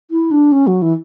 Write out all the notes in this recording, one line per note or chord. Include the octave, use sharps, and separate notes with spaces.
E4
D4
C#4
F#3
E3